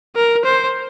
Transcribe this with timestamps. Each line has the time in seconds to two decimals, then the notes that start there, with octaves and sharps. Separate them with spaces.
0.16 A#4
0.45 C5